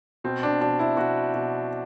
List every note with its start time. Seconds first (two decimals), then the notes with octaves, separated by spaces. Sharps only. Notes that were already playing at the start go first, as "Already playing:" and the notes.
0.24 B2 C4
0.43 D4
0.61 B2 D4
0.79 E4
0.97 B2 F#4
1.34 B2